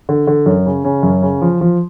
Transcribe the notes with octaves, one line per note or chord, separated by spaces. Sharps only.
D3
D3
F#2
C#3
C#3
F#2
C#3
F3
F3